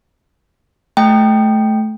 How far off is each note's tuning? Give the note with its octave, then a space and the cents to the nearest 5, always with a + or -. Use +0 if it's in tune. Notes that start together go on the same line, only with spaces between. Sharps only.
A3 -25 G5 +0